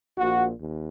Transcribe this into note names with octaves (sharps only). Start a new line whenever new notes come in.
A#1 A#2 F3 F#4
D#2